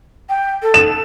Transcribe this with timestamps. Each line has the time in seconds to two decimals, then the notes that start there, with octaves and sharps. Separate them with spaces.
0.29 G5
0.62 A4
0.74 E7